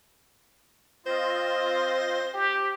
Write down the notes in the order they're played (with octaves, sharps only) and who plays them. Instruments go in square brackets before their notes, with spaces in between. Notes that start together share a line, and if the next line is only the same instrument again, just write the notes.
[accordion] C4 F4 D#5 [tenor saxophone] C5
[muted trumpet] G4